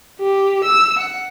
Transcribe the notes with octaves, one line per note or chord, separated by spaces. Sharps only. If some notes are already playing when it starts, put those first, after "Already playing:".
G4
E6
F#5